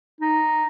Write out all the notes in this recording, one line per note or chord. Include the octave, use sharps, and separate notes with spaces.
D#4